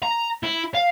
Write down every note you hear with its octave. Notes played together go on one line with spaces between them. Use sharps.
A#5
E4
F5